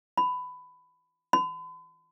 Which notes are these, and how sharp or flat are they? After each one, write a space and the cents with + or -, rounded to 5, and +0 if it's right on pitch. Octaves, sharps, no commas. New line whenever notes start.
B5 +20
B5 +45